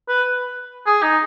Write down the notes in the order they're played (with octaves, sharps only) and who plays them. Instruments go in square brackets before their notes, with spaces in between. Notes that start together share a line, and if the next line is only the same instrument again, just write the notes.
[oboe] B4
G#4
D#4